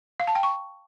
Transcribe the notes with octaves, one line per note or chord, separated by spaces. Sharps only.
F5
A5
G5
C#6